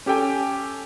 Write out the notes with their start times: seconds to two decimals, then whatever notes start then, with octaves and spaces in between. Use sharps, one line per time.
0.06 C#4 G4 A4 G5 G#5